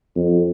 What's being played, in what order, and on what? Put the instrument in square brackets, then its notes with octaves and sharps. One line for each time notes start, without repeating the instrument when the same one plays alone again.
[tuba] F2